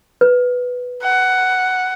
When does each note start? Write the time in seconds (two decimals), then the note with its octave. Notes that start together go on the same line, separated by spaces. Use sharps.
0.21 B4
1.03 F#5